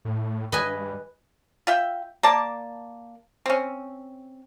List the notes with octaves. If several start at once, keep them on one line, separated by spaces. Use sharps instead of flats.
A2
G2 B4 D#5 G#5
F4 E5 G5
A#3 D5 A5
C4 C#4